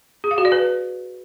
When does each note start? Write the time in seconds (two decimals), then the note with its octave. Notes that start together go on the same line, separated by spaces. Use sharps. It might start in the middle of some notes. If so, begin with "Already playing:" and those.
0.24 G#4
0.31 F5
0.38 F#4
0.45 D5
0.52 B4